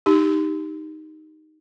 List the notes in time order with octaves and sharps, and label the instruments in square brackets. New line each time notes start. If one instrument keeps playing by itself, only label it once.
[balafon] D#4 G4